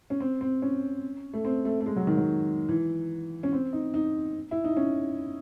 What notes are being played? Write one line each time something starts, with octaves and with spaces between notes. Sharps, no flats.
C#4
C4
C4
C#4
A3
C4
A3
A3
G#3
F#3
D#3
F#3
E3
C#4
C4
D#4
D#4
E4
D#4
C#4